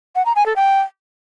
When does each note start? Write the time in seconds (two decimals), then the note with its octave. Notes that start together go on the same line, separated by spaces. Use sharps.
0.15 F#5
0.26 A#5
0.36 G#5
0.46 A4
0.56 G5